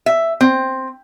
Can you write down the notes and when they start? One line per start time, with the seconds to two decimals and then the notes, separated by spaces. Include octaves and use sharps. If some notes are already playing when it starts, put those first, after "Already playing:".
0.06 E5
0.41 C4